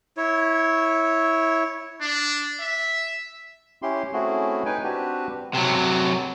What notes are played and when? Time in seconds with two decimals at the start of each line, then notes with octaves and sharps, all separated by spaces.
0.17 E4 C#5
2.01 D4
2.60 E5
3.82 C#4 E4 G4 C6
4.13 A3 C4 C#4 E4 F#4 G#4
4.65 D#4 B4 G5 G#5
4.84 C4 D4 F#4 G4 B4
5.54 C3 F#3